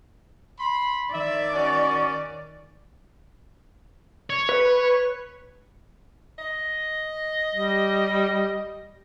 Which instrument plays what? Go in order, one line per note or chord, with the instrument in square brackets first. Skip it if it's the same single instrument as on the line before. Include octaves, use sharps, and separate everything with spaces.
[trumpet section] B5 C6
[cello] D#3 D5 [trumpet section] E5
[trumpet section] C#4 F#4
[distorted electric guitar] C#5
[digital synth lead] B4
[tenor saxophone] D#5
[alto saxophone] G3